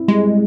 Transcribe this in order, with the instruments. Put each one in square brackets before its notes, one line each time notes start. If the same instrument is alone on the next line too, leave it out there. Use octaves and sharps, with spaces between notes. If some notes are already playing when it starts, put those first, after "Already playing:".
Already playing: [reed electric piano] C4 E4
[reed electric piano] G3 [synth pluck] G#3